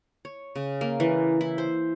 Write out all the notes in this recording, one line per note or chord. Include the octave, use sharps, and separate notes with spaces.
C#5
C#3
A#3
E3
E4
C5